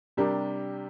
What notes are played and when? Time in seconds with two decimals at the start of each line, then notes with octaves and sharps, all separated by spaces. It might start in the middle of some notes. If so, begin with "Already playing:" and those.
0.17 C3 G3 D4 G4 A#4